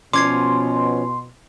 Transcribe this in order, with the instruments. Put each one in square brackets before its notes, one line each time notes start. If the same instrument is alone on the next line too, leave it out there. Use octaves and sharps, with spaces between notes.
[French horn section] B2 [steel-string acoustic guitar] F3 C#4 [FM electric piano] C6 [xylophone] D6 G#6 C7